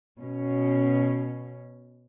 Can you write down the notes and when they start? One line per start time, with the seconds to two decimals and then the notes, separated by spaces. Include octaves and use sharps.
0.18 B2 C#4